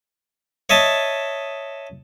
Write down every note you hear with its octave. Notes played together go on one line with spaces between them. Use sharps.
C#5 D#5 E5 A5